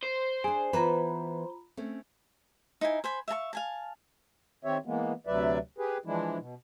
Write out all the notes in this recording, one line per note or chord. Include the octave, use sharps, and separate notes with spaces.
C5
D4 G#4 G#5
E3 B3 F4 B4 A#5 B5
A3 C4 C#4
D#4 E4 G#5
C5 G#5 B5
E5 F5 A5 C#6
F5 G#5 A5
D#3 C4 G4 C#5 E5
E3 G#3 A#3 B3
D2 C3 F#3 B4 D5 E5
G4 G#4 B4
E3 F3 G#3 D4 E4
B2